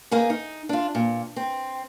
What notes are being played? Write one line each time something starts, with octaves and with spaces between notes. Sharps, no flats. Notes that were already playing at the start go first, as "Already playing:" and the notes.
A#3 D#4 G#4
D#4
D4 F4
A#2
C4